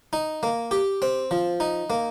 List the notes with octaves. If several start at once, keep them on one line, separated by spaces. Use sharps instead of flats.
D#4
A#3
G4
C4
F3
D#4
A#3